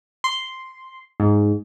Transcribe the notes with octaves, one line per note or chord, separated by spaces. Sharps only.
C6
G#2